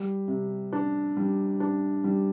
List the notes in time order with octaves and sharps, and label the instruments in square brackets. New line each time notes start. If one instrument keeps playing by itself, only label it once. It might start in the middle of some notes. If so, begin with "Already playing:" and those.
Already playing: [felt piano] G3
C3
D4
G3
D4
G3